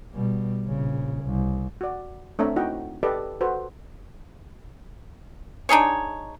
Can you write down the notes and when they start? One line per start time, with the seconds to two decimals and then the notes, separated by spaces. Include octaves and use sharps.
0.13 B2 G3
0.64 A#1 C#3
1.23 C2
1.81 F#4 D5
2.39 A3 C4 D4 C#5 E5 A#5
2.56 D#4 E4 F#4 D#5 F#5 G5
3.03 G4 A4 B4 D5 D#5
3.41 F#4 A4 B4 C5
5.69 D4 D#4 G#4 C#5